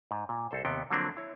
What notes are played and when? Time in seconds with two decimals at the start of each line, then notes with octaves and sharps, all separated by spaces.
0.11 G#2
0.29 A#2
0.51 C2 A4 C5
0.65 D#2 C3 B3 G5
0.90 D3 F3 F#3 A#3 C4 D4
1.17 E4 C#5